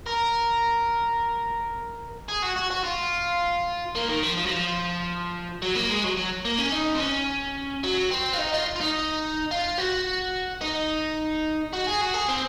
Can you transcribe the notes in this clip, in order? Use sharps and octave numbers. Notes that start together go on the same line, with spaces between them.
A#4
G#4
F#4
F#4
F#4
F4
A#3
D#3
F3
F3
F#3
F3
F#3
A#3
G#3
F#3
F#3
A#3
C#4
D#4
C4
C#4
F#3
C4
F4
D#4
F4
F4
D#4
F4
F#4
D#4
F#4
G#4
F#4
G#4
C4